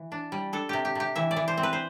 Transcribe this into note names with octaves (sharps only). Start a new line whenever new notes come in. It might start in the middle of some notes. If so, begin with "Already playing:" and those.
Already playing: E3
D4
G3
D4 A4
C3 G4
G4
C3 G4
E3 E5
D5
E3
C5
C4
B4
C5